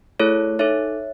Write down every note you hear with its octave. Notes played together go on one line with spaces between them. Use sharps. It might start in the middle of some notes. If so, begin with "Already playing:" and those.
A3 E4 G#4 A4 C#5
D#4 A4 C#5 E5